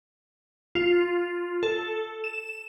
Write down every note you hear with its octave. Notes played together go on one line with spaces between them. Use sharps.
F4
A4
E7